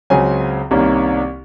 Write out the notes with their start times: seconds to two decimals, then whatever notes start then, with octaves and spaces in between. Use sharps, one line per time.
0.10 C#2 C#3 F#3 C4 G#5
0.71 C2 C3 D#3 A#3 C#4